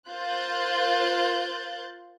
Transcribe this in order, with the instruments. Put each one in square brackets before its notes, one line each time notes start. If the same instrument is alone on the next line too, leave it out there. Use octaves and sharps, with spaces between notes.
[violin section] F4 A#4 C5 F#6 G6 A6